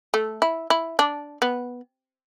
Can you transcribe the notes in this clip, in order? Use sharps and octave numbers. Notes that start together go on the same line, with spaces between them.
A3
E4
E4
D4
B3